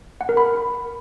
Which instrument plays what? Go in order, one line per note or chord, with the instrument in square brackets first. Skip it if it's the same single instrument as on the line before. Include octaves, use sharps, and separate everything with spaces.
[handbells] F#5
A#4
B5